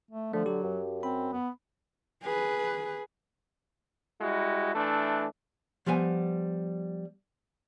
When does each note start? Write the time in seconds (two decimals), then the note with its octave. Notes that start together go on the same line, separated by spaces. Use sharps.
0.11 A3
0.33 D3 F3 A3
0.46 F#3 G4
0.63 F#2
1.03 C4 B5
1.33 B3
2.23 G#4 B4
4.20 G3 G#3 E4 F#4
4.74 E3 A3 D4
5.86 F3 G3 B3 G#5